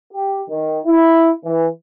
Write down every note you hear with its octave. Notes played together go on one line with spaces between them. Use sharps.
G4
D#3
E4
E3